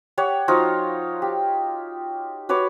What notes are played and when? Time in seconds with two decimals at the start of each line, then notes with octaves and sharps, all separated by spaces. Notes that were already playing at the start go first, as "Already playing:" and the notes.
0.18 G4 C#5 F#5
0.48 F3 D#4 F4 F#4
1.22 G4
2.49 F#4 B4 C#5 D6